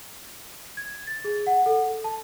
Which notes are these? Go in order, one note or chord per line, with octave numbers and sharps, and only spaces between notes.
G#6
A6
G#4
F#5
A4
A5